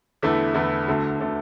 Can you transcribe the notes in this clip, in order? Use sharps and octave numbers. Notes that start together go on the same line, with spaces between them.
E2 D3 A3 E4
E2 D3 A3 E4
D2 D3 A3
D3 A3